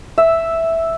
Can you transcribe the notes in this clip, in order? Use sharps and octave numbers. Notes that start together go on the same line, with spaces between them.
E5